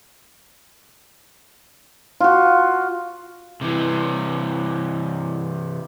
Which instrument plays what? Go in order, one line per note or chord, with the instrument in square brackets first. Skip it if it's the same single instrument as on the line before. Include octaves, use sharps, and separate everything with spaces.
[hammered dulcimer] F4 F#4
[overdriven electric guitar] C3 E3